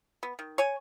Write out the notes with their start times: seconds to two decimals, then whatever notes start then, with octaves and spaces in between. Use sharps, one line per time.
0.23 B3
0.39 D#3
0.58 C#5 G#5